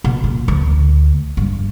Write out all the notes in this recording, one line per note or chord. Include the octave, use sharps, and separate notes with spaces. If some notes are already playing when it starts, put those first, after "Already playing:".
B2
A#2
D2
G2